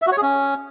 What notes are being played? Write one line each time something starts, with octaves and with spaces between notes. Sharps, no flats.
E5
F#4
C#5
G#4
C#4